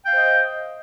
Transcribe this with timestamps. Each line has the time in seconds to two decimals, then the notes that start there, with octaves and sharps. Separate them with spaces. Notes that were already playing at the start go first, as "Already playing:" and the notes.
0.04 G5
0.08 F5
0.12 C5
0.16 D#5